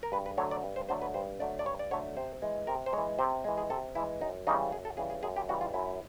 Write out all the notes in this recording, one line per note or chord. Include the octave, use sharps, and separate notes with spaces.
A#4
G2 B4
B4
D3 F#3 A3 C#5
D5
G2
C5
D3 F#3 A3 C5
B4
G2 C5
D3 F#3 A3 D5
D5
G2 C#5
D5
D3 F#3 A3 C#5
C3 C5
E3 G#3
C3 A#4
C5
G#3 C#5
E3
C3 C5
E3 G#3
G#4
C3 A4
E3 G#3 E4
F#2 D#4
C#3 E3 G3 D#4
F#2 G#4
A4
C#3 E3 G3 G#4
G#4
F#2 G#4
G4
C#3 E3 G3 F#4
F4
F#2 E4